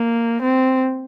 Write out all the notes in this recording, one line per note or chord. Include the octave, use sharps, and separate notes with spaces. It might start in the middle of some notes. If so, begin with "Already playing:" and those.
Already playing: A#3
C4